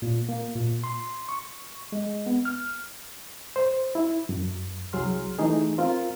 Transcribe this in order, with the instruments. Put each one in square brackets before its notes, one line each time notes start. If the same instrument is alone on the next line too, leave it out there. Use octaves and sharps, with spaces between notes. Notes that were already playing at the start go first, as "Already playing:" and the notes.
[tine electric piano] A#2
A#3
A#2
C6
C#6
G#3
B3
F6
[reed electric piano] C5
E4
F#2
C2 F#3 G#4 C6 F6
E3 A3 D#4 G#4
C4 F4 A#4 F5